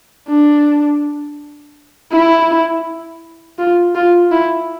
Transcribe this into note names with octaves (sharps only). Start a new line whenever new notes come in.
D4
E4
F4
F4
E4